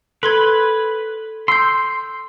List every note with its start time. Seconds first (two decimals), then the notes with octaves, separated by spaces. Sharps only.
0.23 A4 B4 C6 G#6
1.48 C6 E6 G6